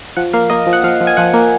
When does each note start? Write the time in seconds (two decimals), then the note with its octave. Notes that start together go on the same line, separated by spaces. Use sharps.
0.17 F3 F#5
0.33 A#3 F5
0.50 A#3 D#5
0.67 F3
0.73 F#5
0.84 F3 F5
1.01 F3
1.07 G#5
1.17 F3 F#5
1.34 A#3